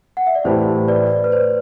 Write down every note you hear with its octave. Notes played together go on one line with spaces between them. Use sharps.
F#5
E5
D5
A2 E3 A3 E4 G4 C5
B4 D5
B4
C5